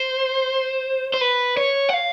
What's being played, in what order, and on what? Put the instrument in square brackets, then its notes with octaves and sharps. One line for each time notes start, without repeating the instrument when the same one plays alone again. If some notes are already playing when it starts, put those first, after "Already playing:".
Already playing: [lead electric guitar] C5
C5
B4
C#5
F#5
F5